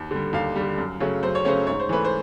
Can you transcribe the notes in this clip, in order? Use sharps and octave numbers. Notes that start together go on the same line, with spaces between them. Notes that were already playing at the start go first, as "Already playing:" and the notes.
Already playing: D#2
D3 G3
D#2 F5
D3 G3
F#2
C#3 F#3 A3 C#4
F#2 C5
C#5
C#3 F#3 A3 C#4 C5
G#2 C#5
C5
E3 A3 B4
C5